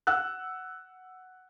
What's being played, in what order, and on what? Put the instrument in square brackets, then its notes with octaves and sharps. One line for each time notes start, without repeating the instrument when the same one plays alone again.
[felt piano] F#5 E6 F#6